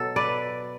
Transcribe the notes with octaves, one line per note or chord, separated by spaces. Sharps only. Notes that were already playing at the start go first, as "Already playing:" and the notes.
Already playing: B2 F#3 A4
B4 D5